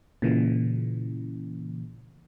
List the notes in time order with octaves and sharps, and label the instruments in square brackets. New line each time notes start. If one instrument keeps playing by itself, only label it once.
[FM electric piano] A#2 C#3 E3